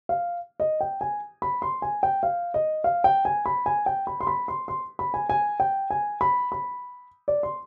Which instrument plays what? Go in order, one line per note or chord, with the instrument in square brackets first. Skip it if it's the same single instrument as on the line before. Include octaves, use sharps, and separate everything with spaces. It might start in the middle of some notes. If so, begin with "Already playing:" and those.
[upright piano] F5
D#5
G5
G#5
B5
C6
G#5
G5
F5
D#5
F5
G5
G#5
B5
G#5
G5
B5
C6
B5
C6
C6
B5
G#5
G#5
G5
G#5
B5
B5
D5
C6